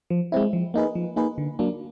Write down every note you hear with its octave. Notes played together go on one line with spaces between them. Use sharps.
F3
G#3 C4 E4
F3
A#3 D#4 G#4 B4
F3
A#3 D#4 G#4 B4
D3
F#3 A#3 D4